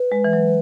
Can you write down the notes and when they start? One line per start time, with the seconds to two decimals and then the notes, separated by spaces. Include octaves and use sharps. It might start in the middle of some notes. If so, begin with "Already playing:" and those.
Already playing: B4
0.12 G#3
0.24 E3
0.33 F#3